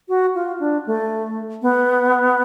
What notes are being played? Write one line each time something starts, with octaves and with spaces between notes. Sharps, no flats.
F#4
F4
D4
A3
B3